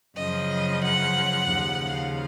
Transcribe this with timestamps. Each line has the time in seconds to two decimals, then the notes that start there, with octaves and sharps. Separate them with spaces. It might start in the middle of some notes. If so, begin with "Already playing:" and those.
0.16 F#2 C#3 F3 D#5
0.84 F#5
1.52 D#2 C#3 F3
1.87 F5